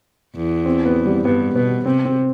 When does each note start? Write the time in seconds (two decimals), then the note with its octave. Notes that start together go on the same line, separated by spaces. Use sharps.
0.36 E2
0.65 C4
0.86 B3
1.06 G3
1.25 G2 B3
1.55 B2 B3
1.85 C3 C4
2.05 C4